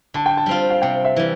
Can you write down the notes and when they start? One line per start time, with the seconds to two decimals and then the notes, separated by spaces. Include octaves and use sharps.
0.14 D3 A5
0.26 G5
0.37 A5
0.46 G3 C4 F4
0.70 F5
0.82 C3 G5
1.04 E5
1.16 E3 G3